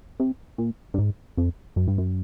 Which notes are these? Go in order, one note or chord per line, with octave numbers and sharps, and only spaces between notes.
C3
A#2
G2
G#2
F2
F#2
G2
F#2